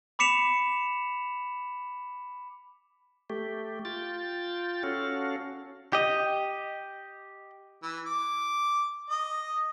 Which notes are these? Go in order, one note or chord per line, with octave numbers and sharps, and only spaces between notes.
B5 D6 B6 C#7 E7 F7
A3 G4
F4 G5 A6
C#4 F#4 A4 F5
G4 D#5
E3
D6
D#5